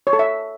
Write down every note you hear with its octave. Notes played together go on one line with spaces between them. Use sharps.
C#5
A4
E5